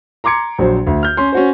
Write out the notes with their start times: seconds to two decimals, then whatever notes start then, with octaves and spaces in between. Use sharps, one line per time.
0.24 A#5 C6 D6 G#6 C#7
0.58 A#1 F#3 C5
0.87 D2
1.03 F6 G6
1.17 C#4 C6
1.33 C#4 F#4 C5